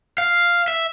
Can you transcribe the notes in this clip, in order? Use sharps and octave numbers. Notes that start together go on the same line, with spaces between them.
F5
E5